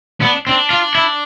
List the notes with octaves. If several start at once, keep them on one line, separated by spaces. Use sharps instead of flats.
B3 D4
C4 D4
F4
E4